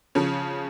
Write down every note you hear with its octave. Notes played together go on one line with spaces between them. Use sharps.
C#3 F3 C#4